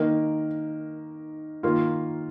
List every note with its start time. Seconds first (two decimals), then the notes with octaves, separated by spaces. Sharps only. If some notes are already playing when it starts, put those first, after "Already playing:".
Already playing: D#3 A#3 D#4 A#4
1.63 D#3 A#3 F4